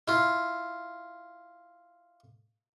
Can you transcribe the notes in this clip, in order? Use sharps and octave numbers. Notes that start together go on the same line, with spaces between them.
E4 F4